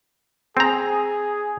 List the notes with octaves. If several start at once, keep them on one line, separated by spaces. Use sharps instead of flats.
C4 G#4 A#5